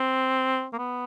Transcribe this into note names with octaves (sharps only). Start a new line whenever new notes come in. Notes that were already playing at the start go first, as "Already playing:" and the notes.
Already playing: C4
A#3
B3